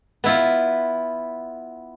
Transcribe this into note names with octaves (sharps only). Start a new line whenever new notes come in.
B3 E4 F4